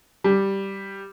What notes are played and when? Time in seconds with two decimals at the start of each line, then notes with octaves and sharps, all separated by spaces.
0.24 G3